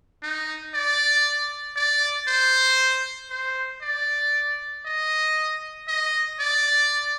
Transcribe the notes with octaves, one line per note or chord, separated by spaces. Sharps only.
D#4
D5
D5
C5
C5
D5
D#5
D#5
D5